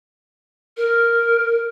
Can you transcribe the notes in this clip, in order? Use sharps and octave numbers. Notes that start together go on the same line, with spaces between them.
A#4